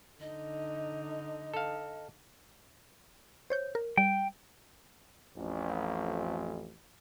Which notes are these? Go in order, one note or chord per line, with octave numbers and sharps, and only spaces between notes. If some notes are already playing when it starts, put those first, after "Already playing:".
D3 D#4 D#5
A4 F5
C5 C#5 G6
A#4
G3 G5
A1 F2